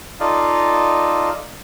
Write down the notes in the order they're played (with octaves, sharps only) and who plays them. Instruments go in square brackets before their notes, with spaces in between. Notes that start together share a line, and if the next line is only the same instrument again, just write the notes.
[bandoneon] D#4 F4 A4 D5 D#5 F5